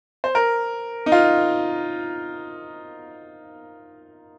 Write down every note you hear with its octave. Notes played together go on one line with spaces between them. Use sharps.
C5
A#4
D#4
F4